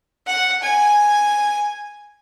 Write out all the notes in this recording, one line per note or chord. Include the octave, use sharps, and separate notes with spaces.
F#5
G#5